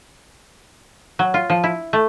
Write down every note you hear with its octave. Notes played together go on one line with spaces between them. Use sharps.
F#3
F4
F3
E4
A3